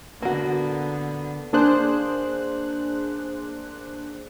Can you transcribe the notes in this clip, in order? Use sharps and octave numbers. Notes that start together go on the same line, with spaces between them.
D3 A#3 B3 F#4
A#3 D4 G#4 C5 F#6